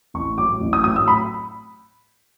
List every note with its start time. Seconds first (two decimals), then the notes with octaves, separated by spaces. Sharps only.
0.14 A1 C#6
0.37 A2 F#3 D6
0.61 A1
0.73 D#6
0.84 A2 F#3 D#6
0.96 E6
1.08 B5